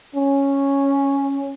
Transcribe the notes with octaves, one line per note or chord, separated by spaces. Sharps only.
C#4